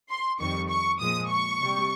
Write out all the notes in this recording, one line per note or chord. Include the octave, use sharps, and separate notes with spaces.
C6
F2 D#3 G3 C#6
C#6
A#2 F3 G#3 D#6
C#6
C3 G3